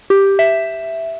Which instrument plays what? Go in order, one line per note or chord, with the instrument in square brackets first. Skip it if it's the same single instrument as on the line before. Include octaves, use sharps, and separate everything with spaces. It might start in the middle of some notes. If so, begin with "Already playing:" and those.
[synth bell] G4
E5